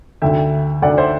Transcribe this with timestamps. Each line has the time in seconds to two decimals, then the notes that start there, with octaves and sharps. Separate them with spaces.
0.22 D2 D3 E5 G5
0.82 D2 D3 D5 F#5
0.97 C5 E5